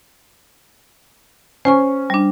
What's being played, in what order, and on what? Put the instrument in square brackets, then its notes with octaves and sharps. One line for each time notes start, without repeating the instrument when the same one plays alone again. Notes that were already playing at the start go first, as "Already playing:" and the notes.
[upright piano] C#4 [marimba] C5 G#5 C#6
[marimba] G3 D4